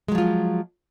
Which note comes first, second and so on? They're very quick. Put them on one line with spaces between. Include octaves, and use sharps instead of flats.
G#3 F#3 F3 F4